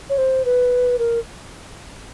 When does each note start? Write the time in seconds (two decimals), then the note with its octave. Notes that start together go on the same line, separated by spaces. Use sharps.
0.09 C#5
0.18 C5
0.45 B4
0.99 A#4